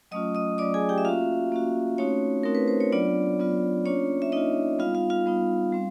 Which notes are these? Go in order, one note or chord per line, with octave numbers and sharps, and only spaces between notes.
F#3 A3 C#4 F4 D#5 D#6
D#5 D#6
F#3 A3 C#4 F4 D5 D6
G#4 G#5
G4 G5
E5
A#3 C#4 F4 F#4 F5
A#3 C#4 F#4
A3 C4 C#4 D#4 F#4 C#5
A3 C4 D#4 F#4 A#4
B4
C5
C#5
F#3 B3 D4 F4 D5
F#3 B3 D4 F4
A#3 C#4 D4 F4 C#5
E5
A#3 D4 D#4 F4 D#5
G3 B3 D#4 F4 F5
F4 F5
F4 F5
G3 B3 D#4
G3 C4